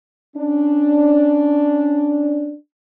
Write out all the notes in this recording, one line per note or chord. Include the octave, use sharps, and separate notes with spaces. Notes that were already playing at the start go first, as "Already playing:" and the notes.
C#4 D4